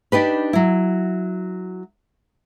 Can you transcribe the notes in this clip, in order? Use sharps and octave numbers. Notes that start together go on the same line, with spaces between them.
D4 D#4 G4 B4
F#3 E4